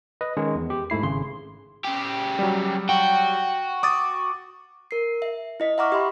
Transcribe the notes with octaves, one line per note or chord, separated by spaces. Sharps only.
B4 D#5
D#3 G#3 C#4
E2
G4
G#2 A3 E4 C7
G#1 C#3 C6
C#3 G4
F#3 G3
F#4 G5
D6 D#6 A6
A#4 C7
E5
E4 D#5 B6
E5 F#5 A#5 C#6 D6 F6
G4 E5 B5 C6